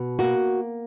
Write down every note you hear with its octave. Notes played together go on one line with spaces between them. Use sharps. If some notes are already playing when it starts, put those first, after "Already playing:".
Already playing: B2
A#3 F#4